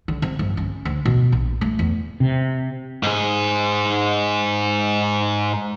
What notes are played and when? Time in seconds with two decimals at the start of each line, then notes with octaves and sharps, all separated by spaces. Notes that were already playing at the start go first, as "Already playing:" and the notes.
0.08 D3
0.22 C3
0.39 G1
0.57 C#4
0.85 D2
1.05 B2
1.32 A#1
1.61 A3
1.79 E2
2.20 C3
3.03 G#2 G#4